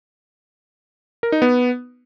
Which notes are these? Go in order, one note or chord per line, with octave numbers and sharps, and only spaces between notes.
A#4
D#4
B3